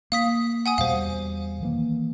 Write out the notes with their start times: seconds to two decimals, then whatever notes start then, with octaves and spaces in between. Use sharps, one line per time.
0.12 A#3 F5 D#6 B6
0.66 F#5 G#5 D#6
0.78 E2 B2 G3 C5 F5
1.61 D#3 E3 A#3